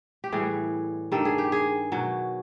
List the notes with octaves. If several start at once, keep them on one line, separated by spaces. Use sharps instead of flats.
G4
A2 E3 G3 G#4
G2 D#3 G3 A4
G#4
G4
G#4
B2 F#3